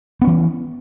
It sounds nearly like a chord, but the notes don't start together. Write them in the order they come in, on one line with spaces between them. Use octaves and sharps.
B3 C#4 E3